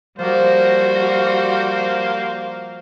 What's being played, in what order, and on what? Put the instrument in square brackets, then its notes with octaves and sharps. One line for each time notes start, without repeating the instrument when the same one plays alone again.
[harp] F3 [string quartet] G3 F#4 [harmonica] A#3 C5 F5